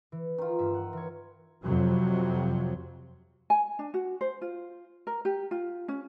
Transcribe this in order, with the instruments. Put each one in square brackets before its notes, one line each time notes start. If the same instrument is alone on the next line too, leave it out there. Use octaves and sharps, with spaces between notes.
[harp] E3
[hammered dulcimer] D#3 F4
[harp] G2 G3 E5
F#5
E3 C#5
[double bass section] F2 C3 F#3
[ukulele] G#5
D4
F#4
C5
F4
A#4
G4
F4
C#4